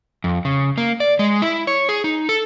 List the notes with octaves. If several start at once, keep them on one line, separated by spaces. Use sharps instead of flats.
F2
C#3
A#3
D5
G#3
E4
C#5
G#4
D#4
A4